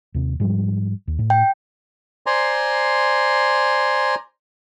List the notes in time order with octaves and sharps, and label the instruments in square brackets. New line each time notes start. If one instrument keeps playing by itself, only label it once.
[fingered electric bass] D#2 C3
G#2 F3 G3
D#2
A2
[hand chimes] G5
[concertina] C5 D5 G#5 A#5 C6